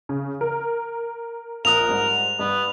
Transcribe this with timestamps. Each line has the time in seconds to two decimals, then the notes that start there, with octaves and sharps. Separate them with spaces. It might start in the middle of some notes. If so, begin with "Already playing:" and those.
0.09 C#3
0.41 A#4
1.65 A#1 A#4 D#6 F#6 F7
1.89 G#2 G3
2.39 G2 B3